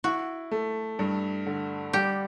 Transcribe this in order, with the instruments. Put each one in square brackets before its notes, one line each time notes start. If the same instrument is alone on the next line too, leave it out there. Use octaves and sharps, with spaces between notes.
[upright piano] E4 [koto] F#4
[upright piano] A3
G2
D3
[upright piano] G3 [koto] G4